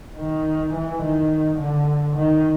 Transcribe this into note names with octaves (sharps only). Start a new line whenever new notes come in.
D#3
E3
D#3
D3
D#3